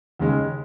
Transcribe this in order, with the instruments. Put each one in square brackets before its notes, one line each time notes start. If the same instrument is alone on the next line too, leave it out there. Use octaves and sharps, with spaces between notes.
[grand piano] D#2 C#3 G#3